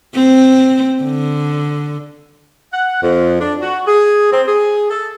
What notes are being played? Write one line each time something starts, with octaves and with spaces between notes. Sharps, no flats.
C4
D3
F#5
F2
D4
F#4
G#4
C4
G#4
A4